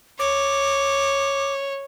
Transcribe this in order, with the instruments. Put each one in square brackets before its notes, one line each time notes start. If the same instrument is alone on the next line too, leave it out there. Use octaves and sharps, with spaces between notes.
[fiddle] C#5 [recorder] D6